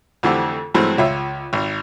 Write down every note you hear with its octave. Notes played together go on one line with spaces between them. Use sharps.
F2 D3 E3 A3 C4 G4
G2 E3 F#3 G#3 A3 C4
C#2 F4 C#5 E5
G#1